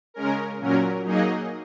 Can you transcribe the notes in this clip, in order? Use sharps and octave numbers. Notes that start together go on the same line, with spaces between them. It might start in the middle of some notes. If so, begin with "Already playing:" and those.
C#3 G#3 C#4 A#4
A#2 F#3 C#4 A#4
F#3 A#3 D#4 G#4 D#5